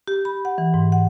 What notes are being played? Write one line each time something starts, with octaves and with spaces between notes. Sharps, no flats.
G4
B5
F#5
E3
G#2
F#5